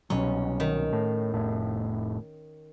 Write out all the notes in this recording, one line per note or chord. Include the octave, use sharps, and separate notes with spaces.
C2 B2 F#3 C#4
D#3
A2
F1 A2